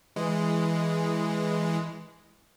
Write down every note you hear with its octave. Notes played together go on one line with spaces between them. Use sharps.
E3 G#3